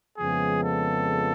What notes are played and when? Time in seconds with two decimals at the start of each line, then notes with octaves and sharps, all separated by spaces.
0.19 F2 C#3 F3 G#3 B3 G#4
0.63 A4